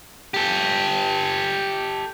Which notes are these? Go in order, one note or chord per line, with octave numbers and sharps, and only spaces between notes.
G4 A4